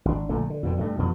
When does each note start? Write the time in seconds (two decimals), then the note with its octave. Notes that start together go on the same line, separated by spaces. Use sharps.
0.05 G#1 D4
0.29 A#1 A#2 D3 A3
0.50 D3
0.63 F2 B2 D3
0.79 G2 A3
0.98 F2 B2 E3 F3